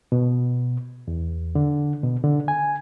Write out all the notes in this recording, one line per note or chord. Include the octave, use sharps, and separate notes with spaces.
B2
E2
D3
B2
D3
G#5